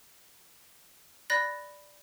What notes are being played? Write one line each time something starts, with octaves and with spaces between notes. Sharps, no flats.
D5 B5 F#6 A6 A#6